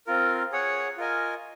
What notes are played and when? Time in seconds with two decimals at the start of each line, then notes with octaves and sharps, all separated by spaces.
0.07 C4 F4 A#4
0.52 G#4 C#5 F#5
0.98 F4 A#4 D#5 G#5